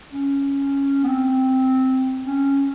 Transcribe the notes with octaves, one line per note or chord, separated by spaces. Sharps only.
C#4
B3
C4
C#4